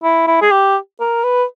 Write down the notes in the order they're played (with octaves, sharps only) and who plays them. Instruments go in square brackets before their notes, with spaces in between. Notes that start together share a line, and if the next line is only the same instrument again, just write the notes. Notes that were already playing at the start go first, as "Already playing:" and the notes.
[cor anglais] E4
E4
G#4
G4
A#4
B4